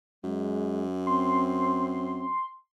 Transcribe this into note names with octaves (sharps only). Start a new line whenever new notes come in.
F#2 G#3
C4 C6